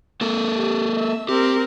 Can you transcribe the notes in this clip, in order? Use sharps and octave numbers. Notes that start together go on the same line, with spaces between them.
A#3 A4 A#4
G4
E5
C4 G4 A#4